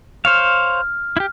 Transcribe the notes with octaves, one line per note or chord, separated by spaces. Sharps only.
C5 C#5 F5 F6
E4 G4